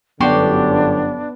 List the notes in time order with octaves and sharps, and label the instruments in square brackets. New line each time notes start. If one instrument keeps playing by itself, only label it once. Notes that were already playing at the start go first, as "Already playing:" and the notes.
[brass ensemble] G1 F#2 D3 [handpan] B3 [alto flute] D4 [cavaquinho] F#4 G4 C6